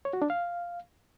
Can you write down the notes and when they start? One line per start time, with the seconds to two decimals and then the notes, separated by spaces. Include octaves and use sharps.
0.05 C#5
0.13 F#4
0.22 D4
0.30 F5